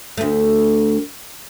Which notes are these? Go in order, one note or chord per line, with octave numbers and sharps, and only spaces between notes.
D2 A3